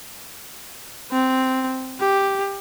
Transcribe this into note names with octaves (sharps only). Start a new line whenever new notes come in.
C4
G4